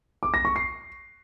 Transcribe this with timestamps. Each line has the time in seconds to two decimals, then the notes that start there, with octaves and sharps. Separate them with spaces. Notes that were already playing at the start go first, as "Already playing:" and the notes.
0.23 D6
0.34 A#6
0.45 C#6
0.56 C7